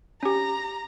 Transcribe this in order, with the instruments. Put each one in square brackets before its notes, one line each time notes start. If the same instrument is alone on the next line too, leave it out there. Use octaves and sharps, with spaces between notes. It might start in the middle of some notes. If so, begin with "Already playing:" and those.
[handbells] C#4 G4 [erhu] A#5